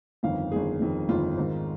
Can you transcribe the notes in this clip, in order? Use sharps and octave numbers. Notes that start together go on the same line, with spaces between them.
G1 F2 D#3 F5
G1 F2 D#3 G#4
G1 F2 D#3
G1 F2 D#3 F4
G#1 G#2 D#3